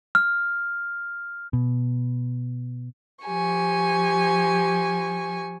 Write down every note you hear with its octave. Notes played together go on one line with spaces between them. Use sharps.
F6
B2
F3 G4 G#5 C#6